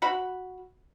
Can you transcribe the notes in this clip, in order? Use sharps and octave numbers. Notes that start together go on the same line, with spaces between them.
F#4 B5